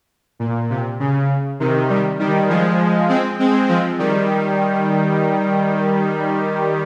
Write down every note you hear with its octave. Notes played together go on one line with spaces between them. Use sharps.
A#2
C3
C#3
C3 D#3
D#3 G3
D#3 G3
F3 G#3
G#3 C4
G#3 C4
F3 G#3
D#3 G3